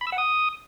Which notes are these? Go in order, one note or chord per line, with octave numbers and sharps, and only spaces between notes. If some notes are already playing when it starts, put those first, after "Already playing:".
B5
E6
F#5
D#6